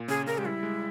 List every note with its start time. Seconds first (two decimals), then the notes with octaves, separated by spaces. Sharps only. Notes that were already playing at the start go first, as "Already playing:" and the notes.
Already playing: A#2
0.08 C#3 G#4
0.27 C#3 A#4
0.38 G#3 G4
0.45 G3 E4
0.63 G#3